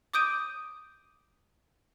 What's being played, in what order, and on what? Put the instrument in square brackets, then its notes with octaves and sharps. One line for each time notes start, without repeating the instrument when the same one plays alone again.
[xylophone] D6 D#6 G6 D7 D#7